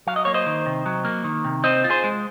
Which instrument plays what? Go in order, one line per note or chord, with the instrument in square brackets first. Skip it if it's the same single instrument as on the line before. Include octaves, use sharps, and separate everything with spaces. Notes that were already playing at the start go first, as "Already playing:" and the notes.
[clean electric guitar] F#3 F5
D#5
A#3 C#5
C5 D#5
D#3
C3
F#3
A#3
D#3
C3
C4 C5 D#5
F4
G#4 C5
G#3